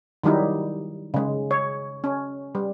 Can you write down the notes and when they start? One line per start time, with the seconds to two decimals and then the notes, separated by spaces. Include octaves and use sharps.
0.24 D#3 F#3 G3 D#4 E4
1.14 C#3 G#3
1.51 C#5
2.04 C#4
2.55 G3